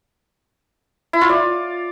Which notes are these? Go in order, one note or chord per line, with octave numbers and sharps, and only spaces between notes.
E4
F4
D5